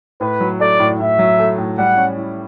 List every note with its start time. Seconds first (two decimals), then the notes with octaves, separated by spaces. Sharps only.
0.21 A2 B4
0.41 F#3
0.60 A3 D5
0.80 A2
0.99 A2 E5
1.19 F#3
1.39 A3
1.58 A2
1.78 G3 F#5
1.97 C#4
2.17 E4